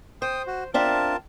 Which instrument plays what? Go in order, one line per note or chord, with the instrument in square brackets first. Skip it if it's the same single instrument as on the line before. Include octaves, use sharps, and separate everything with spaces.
[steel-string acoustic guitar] C5 [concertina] G5 D#6
[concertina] F#4
[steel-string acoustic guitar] C4 D4 E5 [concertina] F4 A#4 A5